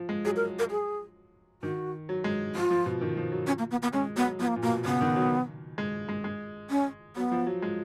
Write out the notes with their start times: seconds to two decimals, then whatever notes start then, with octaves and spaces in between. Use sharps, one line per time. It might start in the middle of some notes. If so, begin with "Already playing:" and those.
Already playing: F3
0.09 G#3
0.25 F#3 G#4
0.36 A#4
0.59 A#4
0.70 G#4
1.62 D#3 F#4
2.09 F#3
2.24 G#3
2.55 F3 F4
2.71 F3
2.86 B2
3.01 D#3
3.17 F3
3.32 F#3
3.47 C#4
3.59 A#3
3.71 B3
3.82 B3
3.93 G#3 C#4
4.16 F#3 B3
4.39 F3 B3
4.47 A#3
4.56 A#2
4.62 B2 A#3
4.85 C#3 B3
5.01 D#3
5.16 F#3
5.78 G#3
6.09 G#3
6.24 G#3
6.70 C#4
7.16 F#3 B3
7.32 F3
7.47 F#3
7.62 G#3